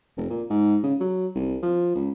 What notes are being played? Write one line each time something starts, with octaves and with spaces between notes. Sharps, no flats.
F1
A#2
G#2
C#3
F#3
C2
F3
C#2